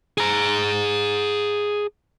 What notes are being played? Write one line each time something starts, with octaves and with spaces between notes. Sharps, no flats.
G#4 A#5